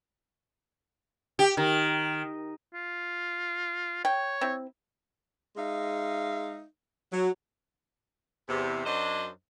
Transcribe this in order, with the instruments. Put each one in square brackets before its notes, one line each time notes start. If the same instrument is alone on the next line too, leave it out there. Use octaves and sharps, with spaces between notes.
[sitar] G4
D#3
[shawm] F4
[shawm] C#5 [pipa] G5
[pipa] C4 E4
[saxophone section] G#3 D#4 E5 F5
F#3
E2 C3
F#2 F#3 D4 C5 D#5